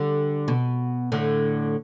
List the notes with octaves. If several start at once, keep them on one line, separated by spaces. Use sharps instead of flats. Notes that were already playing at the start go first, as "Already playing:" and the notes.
Already playing: D3 G3
B2
A2 D3